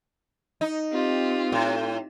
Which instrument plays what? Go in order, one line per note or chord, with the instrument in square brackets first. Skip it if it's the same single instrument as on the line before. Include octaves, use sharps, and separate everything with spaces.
[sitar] D#4
[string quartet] C4 F4 G4
[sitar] A2